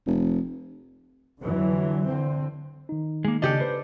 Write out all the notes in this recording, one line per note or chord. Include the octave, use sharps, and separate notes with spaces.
F1
F2 D3 E3 F#3
D3 C4
D#3 D#4
G#3 A#3
C#3 D4 G4 A4 D#5
B4 C5